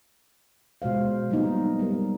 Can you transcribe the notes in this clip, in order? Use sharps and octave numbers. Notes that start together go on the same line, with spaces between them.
B2 G#3 C5 F5
F#3 G3 A#3 B3 D#4 F#4
G3 A#4